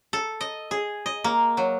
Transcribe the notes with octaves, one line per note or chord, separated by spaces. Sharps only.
A4
D#5
G#4
D#5
A#3
F#3